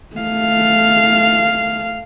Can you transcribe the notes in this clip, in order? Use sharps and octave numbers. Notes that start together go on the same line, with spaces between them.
A3 F5